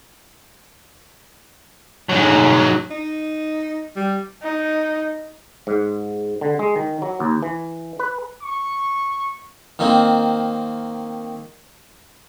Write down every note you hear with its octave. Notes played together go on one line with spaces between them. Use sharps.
G#2 F#3
D#4
G3
D#4
G#2
D3
G#3
D#3
F#3
D#2
E3
B4
C#6
D#3 A#3 C4